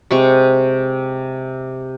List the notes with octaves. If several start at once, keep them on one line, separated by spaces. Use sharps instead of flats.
C3 G#3 C#6